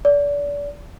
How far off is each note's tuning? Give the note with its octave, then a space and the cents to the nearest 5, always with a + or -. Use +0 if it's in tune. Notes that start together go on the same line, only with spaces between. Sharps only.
D5 -30